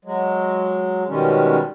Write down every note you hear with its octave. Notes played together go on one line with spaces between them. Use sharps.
F#3 G#3
B2 D#3 G3 G#3 C#4